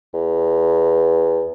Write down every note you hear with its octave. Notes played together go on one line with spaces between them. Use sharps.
E2